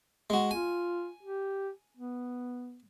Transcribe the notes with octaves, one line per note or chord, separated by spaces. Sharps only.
G#3 F#4
F4 G#5
G4
B3